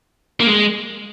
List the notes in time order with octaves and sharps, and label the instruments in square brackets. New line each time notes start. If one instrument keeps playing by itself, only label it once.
[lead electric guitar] A#3
G#3